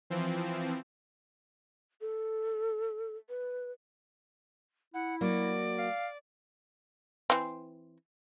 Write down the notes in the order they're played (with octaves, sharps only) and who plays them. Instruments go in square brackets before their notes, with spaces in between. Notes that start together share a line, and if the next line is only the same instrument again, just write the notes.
[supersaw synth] E3 F3 C4
[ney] A4
B4
[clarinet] E4 [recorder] F#5
[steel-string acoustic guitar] F#3 A#3 F#4 [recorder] D5
[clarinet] F5
[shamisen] E3 C4